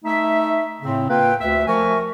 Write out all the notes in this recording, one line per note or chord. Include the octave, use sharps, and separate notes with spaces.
A3 D#4 E5
A2 C#3 C4
A#3 F4 B4 G5
D2 E5
F3 A3 A#4 G#5 C#6